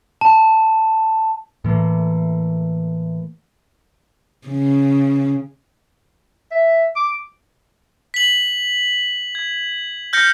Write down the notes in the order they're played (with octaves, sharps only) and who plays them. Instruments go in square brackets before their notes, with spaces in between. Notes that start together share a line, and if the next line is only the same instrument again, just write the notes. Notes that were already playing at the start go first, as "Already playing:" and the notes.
[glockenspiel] A5
[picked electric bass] A2 E3 A3 A#3
[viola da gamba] C#3
[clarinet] E5
D6
[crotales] B6 F#7
G#6
F6 G6 A#6 C#7